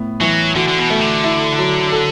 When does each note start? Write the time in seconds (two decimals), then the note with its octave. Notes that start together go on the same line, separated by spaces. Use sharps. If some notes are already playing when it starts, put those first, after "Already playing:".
Already playing: A2 B3
0.21 E3 F#3
0.55 D3 F#4
0.68 D3
0.78 B2
0.90 A3
1.01 D3
1.24 E4
1.58 F#3
1.92 A4